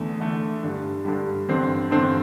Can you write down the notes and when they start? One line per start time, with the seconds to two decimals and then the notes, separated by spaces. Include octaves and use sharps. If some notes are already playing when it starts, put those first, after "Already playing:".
Already playing: E2 D3 A3
0.20 E2 D3 A3
0.63 G2 D3 G3
1.05 G2 D3 G3
1.48 A1 G2 D3 C4
1.91 A1 G2 D3 C4